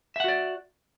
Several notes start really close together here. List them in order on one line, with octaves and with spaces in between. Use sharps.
E5 F#5 F#4 D5